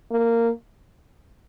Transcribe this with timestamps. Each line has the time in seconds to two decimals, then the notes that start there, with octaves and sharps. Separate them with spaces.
0.11 A#3